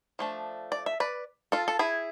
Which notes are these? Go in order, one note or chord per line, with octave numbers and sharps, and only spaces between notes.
F3 A3 D4
D5
E5
B4 D5
F4 A4
A4
E4 G#4